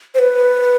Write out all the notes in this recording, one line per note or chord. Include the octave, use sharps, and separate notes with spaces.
C5
B4